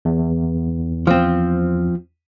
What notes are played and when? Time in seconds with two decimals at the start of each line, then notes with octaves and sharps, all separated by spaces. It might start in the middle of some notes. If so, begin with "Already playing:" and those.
0.05 E2
1.07 F3 C4